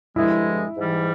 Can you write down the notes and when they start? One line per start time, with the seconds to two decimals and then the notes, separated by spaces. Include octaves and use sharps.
0.16 G2 D3 F3 G#3 E4
0.77 G#2 E3 G3